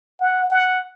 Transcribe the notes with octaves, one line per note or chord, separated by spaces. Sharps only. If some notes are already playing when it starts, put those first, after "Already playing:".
F#5
F#5